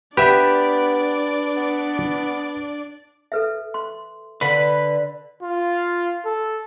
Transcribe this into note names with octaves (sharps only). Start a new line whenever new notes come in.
B3 D4 G4 B4 D5 E5
B3
A4 B4 E5
C6
D3 B4 B5
F4
A4